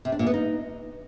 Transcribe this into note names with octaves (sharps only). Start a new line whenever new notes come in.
C3
D4
A#2
B3
D#4